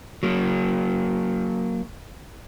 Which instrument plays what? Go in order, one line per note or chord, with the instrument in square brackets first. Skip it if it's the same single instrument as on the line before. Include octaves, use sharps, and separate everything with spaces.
[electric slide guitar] F#3 A#3